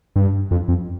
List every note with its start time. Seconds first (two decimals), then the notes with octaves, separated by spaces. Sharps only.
0.16 G2
0.51 F2
0.68 F2